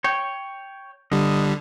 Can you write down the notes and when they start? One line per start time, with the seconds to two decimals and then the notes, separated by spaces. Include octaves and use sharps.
0.04 C#5 G5
1.12 D3 G3 D#5